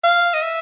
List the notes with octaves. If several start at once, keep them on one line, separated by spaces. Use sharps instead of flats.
F5
D#5
E5